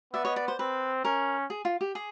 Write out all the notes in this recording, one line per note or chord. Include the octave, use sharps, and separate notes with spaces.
B3 D5 E5
C#5 D#5
D5
C5
C4 B4
C#4 A#4
G#4
F4
G4
G#4